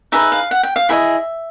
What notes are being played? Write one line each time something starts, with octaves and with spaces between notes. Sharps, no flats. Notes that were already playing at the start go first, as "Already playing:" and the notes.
D#4 G#4 B4 E5
F5
F#5
G5
F5
E4 G#4 B4 D#5 E5